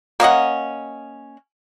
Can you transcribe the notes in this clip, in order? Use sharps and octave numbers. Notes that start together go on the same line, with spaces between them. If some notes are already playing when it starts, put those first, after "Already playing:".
A#3 C#4 D#5 F#5